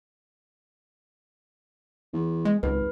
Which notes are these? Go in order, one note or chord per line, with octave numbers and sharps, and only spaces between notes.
E2
G#3
G#1 C#2 B4